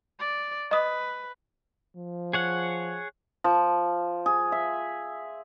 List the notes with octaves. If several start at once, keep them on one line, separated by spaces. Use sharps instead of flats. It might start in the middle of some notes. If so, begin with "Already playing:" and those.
D5
B4 D#5 D#6
F3
G#4 C#5 F#5
F3
G#4
E5